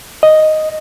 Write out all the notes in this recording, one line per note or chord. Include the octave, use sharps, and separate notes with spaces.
D#5